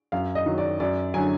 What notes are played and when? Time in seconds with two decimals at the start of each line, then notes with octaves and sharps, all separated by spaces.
0.12 F#2 F5
0.35 D#5
0.46 D#3 F#3
0.58 D5
0.80 F#2 D5
1.14 D3 F#3 G#5